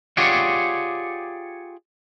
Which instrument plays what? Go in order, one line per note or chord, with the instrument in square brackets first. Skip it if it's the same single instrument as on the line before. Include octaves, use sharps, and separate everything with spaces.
[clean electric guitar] F4 G4 G#4 C#5 D5 F#5